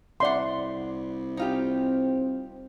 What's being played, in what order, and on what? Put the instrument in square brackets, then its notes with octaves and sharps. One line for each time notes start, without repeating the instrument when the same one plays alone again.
[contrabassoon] C2 [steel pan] D5 C6 [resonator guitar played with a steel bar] E5 F#5
[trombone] C4 [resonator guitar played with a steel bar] D#4 F4 G4